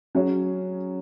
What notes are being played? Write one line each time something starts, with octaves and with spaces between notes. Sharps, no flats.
F#3 C#4 G#4 C#5